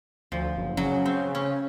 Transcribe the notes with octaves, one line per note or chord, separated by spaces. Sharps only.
D2 F3
F#1
C#3 F#3
C4
C#4